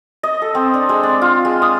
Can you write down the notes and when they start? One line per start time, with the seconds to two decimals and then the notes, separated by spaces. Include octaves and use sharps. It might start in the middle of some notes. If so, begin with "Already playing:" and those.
0.23 D#5
0.42 A4
0.55 C4
0.74 D4
0.89 G#3
1.03 D4
1.21 F4
1.45 G#3
1.62 D#6